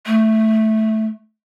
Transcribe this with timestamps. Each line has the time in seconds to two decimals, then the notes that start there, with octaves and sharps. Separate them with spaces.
0.06 A3